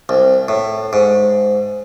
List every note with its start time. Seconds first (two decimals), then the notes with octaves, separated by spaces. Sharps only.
0.09 C2
0.48 A2
0.93 G#2